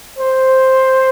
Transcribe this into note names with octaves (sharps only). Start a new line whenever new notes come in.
C5